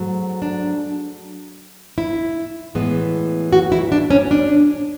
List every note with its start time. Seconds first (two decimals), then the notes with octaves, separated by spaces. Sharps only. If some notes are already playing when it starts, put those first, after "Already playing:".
Already playing: G#2 F#3 A3
0.42 D4
1.98 E4
2.75 A2 E3 G#3 B3
3.53 F#4
3.72 E4
3.92 D4
4.10 C#4
4.31 D4